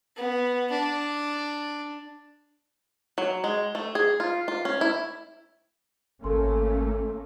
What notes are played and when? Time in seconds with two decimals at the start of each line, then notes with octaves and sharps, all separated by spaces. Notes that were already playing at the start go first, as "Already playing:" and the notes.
0.17 B3
0.71 D4
3.18 F#3
3.44 G#3
3.75 A3
3.95 G#4
4.20 F4
4.48 F4
4.65 C#4
4.81 E4
6.24 G#1 A3 A#3 C#4 A4 C6